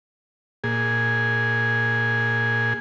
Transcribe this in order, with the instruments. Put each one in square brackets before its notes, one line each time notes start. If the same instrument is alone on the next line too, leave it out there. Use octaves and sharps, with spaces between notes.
[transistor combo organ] A#2 G#4